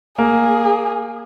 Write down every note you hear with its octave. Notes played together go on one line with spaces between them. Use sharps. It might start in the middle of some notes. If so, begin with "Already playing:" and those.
A#3 G#4